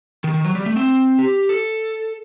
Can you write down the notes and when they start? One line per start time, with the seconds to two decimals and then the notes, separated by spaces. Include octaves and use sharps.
0.24 D#3
0.34 D#3
0.44 F#3
0.55 G3
0.66 A3
0.76 C4
1.19 G4
1.49 A4